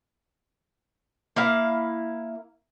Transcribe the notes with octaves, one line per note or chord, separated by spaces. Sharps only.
A#3 E4 F5